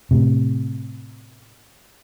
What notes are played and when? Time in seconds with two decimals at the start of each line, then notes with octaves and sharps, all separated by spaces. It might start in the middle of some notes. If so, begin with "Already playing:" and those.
0.11 A2 C3